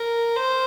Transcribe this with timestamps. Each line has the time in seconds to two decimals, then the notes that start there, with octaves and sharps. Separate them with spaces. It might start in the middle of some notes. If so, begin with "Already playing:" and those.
Already playing: A#4
0.36 C5